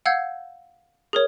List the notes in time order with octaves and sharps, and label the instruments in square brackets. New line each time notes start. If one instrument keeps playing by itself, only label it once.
[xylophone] F5 F#5 E6 G6 G#6
G#4 A#4 C#5